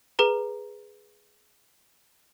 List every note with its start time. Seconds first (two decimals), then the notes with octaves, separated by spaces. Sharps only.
0.19 G#4 B4 A#5